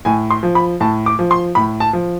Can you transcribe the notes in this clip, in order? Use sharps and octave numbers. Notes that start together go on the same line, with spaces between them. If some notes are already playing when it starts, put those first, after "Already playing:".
A2 G#5
C6
F3
B5
A2 A5
D6
F3
C6
A2 B5
A5
F3